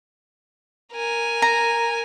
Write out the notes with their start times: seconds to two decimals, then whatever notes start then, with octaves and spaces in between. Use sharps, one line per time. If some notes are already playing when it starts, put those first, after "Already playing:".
0.93 A#4 G#5
1.42 A#5